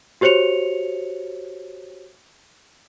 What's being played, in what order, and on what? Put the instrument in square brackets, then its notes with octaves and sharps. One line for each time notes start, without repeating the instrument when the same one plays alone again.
[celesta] F#4 G4 C5 C#5 C#7 F7